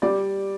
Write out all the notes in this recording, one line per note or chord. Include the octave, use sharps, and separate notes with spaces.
G3 D5